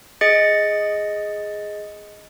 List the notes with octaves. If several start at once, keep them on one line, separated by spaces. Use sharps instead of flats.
G#4 D#5 A6 C#7